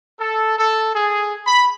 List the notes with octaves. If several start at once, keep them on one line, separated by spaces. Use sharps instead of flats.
A4
A4
G#4
B5